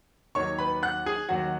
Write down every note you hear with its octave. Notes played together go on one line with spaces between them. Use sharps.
D#2 D#3 F#3 C#5 C#6
B4 B5
F#5 F#6
G#4 G#5
D#2 D#3 F#3 F#4 F#5